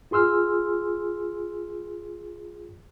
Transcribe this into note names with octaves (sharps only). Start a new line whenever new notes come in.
F4 G#4 C6 E6 F6